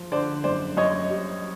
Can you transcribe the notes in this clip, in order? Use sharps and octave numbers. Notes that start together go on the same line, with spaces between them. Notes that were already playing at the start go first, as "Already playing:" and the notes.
Already playing: F3
D3 C5 D5
F#2 C5 D5
F#2 C#5 D#5
G3